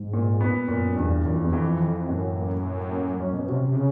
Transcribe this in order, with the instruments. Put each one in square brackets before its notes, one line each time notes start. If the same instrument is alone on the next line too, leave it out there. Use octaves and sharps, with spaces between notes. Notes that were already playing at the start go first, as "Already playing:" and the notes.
Already playing: [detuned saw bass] G#2
[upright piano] A#2
B3
[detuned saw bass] F#2 [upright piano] A#2
[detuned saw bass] E2 [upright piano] G2
[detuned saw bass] F#2 [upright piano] E3
[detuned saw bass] F2
E2
[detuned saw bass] F2 [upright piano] E3
[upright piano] E3
[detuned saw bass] F#2 [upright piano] A2
[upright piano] A#3
A2
A#3
[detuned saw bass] F#2 [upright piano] C#4
[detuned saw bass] B2
[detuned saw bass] C3 [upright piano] C#4
[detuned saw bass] C3
[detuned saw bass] C#3 [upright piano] C#4